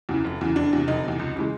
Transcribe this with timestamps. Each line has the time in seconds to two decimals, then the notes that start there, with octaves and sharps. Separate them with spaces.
0.09 E2 C#3 E3
0.24 F1
0.41 E2 C#3 E3
0.56 F1 D4
0.73 E2 C3
0.88 F1 D#4
1.04 E2 C3
1.19 C#2
1.36 C#3 E3 G#3